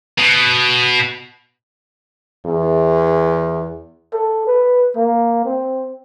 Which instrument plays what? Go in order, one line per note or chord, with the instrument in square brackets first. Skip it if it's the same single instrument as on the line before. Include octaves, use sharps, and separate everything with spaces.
[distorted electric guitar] B2
[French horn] E2
[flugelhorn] A4
B4
A#3
C4